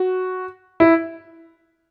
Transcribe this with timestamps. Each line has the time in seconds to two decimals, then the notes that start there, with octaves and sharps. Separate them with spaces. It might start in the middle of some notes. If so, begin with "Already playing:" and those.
Already playing: F#4
0.80 E4